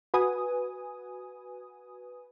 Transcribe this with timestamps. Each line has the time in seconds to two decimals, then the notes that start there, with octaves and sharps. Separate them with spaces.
0.14 F#4 B4 G#5 D#6